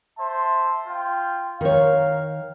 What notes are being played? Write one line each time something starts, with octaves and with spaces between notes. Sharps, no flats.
C5 E5 A5
F4 G5
D#3 A#4 C#5 F5